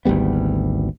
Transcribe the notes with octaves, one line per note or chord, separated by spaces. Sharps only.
G#1 D2 G3 B3